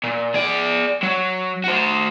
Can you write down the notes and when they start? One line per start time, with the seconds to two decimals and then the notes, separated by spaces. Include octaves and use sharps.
0.04 A#2
0.34 G#4 D5
1.03 F#3
1.64 F#4 C5